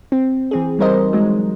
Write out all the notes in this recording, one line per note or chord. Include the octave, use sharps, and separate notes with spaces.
C4
E3 C4 G#4
G3 D#4 A#4 C5 D#5
F#3 G#3